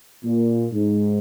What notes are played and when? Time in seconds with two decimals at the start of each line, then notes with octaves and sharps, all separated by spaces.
0.25 A#2
0.73 G#2